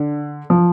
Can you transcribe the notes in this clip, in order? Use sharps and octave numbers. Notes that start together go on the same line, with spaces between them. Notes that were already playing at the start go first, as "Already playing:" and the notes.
Already playing: D3
F3